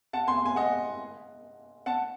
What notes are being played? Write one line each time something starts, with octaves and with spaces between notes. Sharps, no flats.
F#5 A5
G#5 C6
G#5
D#5 F#5
F#5 A5